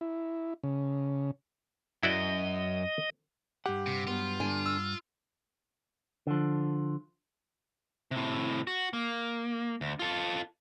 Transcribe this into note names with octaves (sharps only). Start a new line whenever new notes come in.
E4
C#3
F#2 E4 F#4 D5 D#5
G2 G4 F#5
C3
F#3 B3 F4
D3 D4 G#5
E6
D3 F3
A2 C3
F#4
A#3
D2
F4 A4